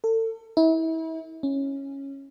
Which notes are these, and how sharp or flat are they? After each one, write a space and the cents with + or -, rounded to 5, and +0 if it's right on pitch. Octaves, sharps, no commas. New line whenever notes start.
A4 +35
E4 -35
C#4 -10